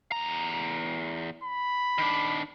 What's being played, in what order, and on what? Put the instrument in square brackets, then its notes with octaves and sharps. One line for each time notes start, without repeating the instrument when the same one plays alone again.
[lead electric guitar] E2 A#5
[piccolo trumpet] B5
[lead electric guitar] D#3 D4